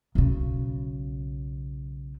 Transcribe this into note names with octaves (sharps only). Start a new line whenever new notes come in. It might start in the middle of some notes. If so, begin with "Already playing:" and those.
B1 C#3